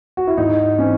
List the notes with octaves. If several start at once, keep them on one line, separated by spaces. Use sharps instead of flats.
F#4
E4
G#2 D#4
E3 C4 C#4